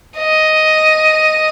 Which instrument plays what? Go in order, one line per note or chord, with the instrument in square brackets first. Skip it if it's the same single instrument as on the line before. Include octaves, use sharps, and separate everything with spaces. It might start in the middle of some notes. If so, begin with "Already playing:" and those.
[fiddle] D#5